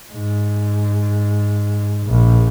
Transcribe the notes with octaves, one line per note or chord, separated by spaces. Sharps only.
G#2
A#1